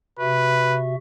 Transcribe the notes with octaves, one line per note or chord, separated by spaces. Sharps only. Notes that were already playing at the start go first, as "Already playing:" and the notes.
C3 F#4 B4 E5